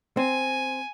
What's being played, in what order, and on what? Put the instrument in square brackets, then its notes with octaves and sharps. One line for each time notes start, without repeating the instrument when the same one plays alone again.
[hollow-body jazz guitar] C4 [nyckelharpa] G#5